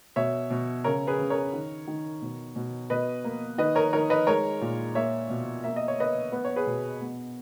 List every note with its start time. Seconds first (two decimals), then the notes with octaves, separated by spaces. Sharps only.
0.16 B2 C#5 E5
0.50 B2
0.84 C#3 A#4 C#5
1.07 G#4 B4
1.19 C#3
1.30 A#4 C#5
1.53 D#3
1.87 D#3
2.22 B2
2.56 B2
2.90 B2 B4 D#5
3.24 A#3
3.58 D#3 B4 D#5
3.75 A#4 C#5
3.93 D#3 A#4 C#5
4.10 B4 D#5
4.27 G#3 A#4 C#5
4.61 A#2
4.95 A#3 C#5 E5
5.30 B2
5.64 A#3 E5
5.76 D#5
5.88 C#5
5.98 A#3 B4 D#5
6.32 B3 B4
6.45 C#5
6.56 G#4 B4
6.67 B2
7.01 B3